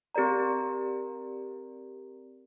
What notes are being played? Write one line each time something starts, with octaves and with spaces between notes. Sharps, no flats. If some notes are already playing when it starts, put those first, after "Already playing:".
C4 G4 A#4 D5 A#5